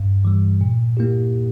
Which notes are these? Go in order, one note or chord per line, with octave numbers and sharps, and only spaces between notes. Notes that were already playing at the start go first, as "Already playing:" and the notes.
Already playing: G2
E3 G3
A#2
A#3 E4 G4